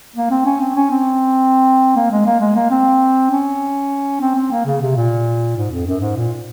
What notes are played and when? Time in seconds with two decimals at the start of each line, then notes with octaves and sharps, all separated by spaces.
0.16 A#3
0.31 C4
0.45 C#4
0.60 C4
0.76 C#4
0.91 C4
1.96 A#3
2.11 G#3
2.26 A#3
2.40 G#3
2.56 A#3
2.71 C4
3.31 C#4
4.21 C4
4.35 C4
4.51 A#3
4.66 C#3
4.82 C3
4.95 A#2
5.57 G#2
5.71 F2
5.87 F#2
6.01 G#2
6.17 A#2